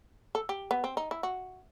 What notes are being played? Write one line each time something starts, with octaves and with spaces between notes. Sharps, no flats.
A4
G4
B3
C4
D#4
E4
F#4